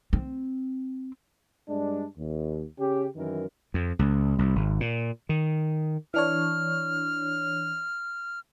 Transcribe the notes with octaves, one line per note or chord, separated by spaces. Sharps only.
C4
G2 G#3 D4
D#2
C#3 C#4 G4
F#2 D#3 E3 A#4
F2
C#2
C2
G#1
A#2
D#3
E3 D4 C#5 F6